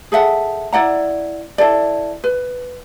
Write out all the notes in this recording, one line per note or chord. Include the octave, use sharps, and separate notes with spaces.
G#4 A4 E5 F#5
E4 D5 F#5 A#5
E4 A4 D5
B4